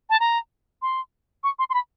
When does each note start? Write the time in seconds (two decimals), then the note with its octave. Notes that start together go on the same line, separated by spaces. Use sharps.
0.10 A5
0.20 A#5
0.82 C6
1.44 C#6
1.59 C6
1.70 C6
1.74 B5